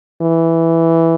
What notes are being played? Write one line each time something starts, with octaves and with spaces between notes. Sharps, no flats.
E3